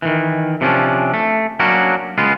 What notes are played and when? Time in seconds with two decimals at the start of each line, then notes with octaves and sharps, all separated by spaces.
0.02 D#3 E3
0.61 C3 F3 A#3 B3 C#4 D4
1.14 A3
1.60 F#3 A#3 C#4 D4 F#4
2.18 C#2 G#3 B3 F4